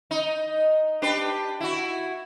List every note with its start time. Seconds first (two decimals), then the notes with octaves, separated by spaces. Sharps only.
0.11 D#4
1.02 D4 G4 B4
1.60 E4 F#4